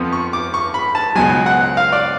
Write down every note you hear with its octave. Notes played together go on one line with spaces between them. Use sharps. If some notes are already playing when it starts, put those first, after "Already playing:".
Already playing: F2 F3 B3
C#6
D6
C#6
B5
A5
C#2 B2 F#3 G#5
F#5
F5
D5